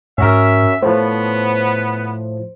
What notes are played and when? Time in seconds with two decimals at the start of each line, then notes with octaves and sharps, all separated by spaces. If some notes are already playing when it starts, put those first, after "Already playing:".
0.18 G#2 C#4 F#4 A#4 E5
0.82 A2 F3 B3 C5